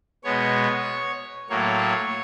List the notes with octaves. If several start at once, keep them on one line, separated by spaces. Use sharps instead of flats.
B2 G#3 B3 C#5
A2 F#3 A#3 C#5